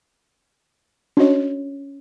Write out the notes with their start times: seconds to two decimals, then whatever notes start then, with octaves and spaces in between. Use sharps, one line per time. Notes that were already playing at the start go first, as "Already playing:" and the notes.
1.17 C#4 D4 F#4 C#5 D#5